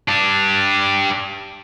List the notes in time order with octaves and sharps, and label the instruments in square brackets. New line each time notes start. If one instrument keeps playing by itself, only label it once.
[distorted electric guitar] D4 G4